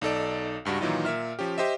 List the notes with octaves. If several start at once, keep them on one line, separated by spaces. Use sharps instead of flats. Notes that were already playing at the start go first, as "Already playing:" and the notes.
B1 D#4 A4 D5
C#2 G2 G3 F#4
A#2 D#3 E3 F#3 D#4 F4
A#2 A#4 E5 F6
F3 C#4 G4
G4 C5 D#5 E5